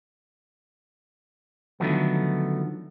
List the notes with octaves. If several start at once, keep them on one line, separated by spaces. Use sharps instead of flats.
D3 D#3 F3 F#3 A3 B3